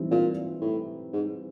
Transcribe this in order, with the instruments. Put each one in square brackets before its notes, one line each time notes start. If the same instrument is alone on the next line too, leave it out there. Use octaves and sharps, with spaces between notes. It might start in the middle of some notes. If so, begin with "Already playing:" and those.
Already playing: [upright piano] E3 G3 C4 D#4
[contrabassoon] A#2
A2
G#2